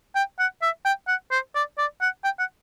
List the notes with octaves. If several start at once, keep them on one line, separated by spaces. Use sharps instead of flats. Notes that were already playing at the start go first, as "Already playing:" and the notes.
G5
F#5
E5
G5
F#5
C5
D5
D5
F#5
G5
F#5